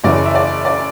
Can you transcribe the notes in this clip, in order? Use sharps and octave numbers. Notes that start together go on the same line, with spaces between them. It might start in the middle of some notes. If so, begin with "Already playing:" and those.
F#1 F#2 C#3 E3 D5
E5
D5
D5